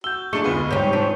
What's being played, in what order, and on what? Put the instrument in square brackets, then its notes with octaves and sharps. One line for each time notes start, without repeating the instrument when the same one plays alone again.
[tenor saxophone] F#4 [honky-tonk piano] E6 [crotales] G6 G7
[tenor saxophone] F#3 [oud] G#3 [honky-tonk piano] A3 D4 [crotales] C#6 C#7 G7
[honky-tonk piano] F1 D2 B3 [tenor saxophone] F4
[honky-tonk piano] G#2 G6 [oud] C3 G3 [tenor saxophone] C#5
[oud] E3 F3 D4